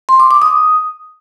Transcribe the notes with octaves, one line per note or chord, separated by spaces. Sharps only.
C6
D6
D6
D#6